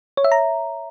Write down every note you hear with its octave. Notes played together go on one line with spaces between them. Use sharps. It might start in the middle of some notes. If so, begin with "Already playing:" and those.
C#5
E5
A#5